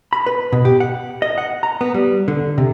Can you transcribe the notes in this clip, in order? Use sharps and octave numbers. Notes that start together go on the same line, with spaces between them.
B5
B4
B2
G4
F#5
D#5
F#5
A#5
B3
G3
D3
C3